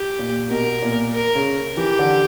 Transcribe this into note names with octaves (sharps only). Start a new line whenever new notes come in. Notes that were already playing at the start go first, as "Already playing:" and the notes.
Already playing: G4
A#2
B2 A#4
A#2
A#4
C#3
E3 G4
D3